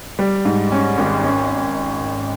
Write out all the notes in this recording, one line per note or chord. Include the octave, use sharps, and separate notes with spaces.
G3
G#2
C#4
G#1
C#4